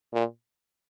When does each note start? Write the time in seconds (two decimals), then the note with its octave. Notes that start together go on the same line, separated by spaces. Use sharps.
0.14 A#2